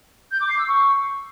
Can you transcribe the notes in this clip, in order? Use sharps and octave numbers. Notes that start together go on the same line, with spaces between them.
G6
D6
C7
E6
C#6